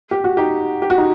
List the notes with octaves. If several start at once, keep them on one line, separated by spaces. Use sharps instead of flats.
G4
F#4
D#4 G4
G4
F#4
D#4